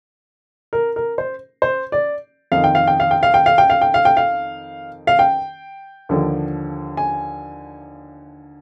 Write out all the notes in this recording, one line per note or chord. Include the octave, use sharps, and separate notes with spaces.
A#4
A#4
C5
C5
D5
F2 D#3 F5
G5
F5
G5
F5
G5
F5
G5
F5
G5
F5
G5
F5
G5
F5
F5
G5
D#2 D3 F3
G#5